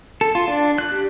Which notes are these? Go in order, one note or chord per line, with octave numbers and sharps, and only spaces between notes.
A4
F4
D4
F#6
G4